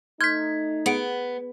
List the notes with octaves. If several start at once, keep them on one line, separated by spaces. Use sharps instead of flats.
A3 D#4 C6 F6 G6 G#6 B6
B3 G#4 F#5 D7